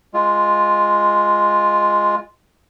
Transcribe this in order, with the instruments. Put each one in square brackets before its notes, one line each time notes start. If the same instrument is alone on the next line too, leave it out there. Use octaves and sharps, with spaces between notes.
[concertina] G#3 F4